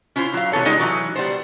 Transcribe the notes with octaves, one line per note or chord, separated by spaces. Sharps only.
C#4 E4 F4 C5
F#3 F5
C3 E3 B3 A4 C#5
G3 G#3 B3 D#4 F4
E3 F#3
G3 B3 C5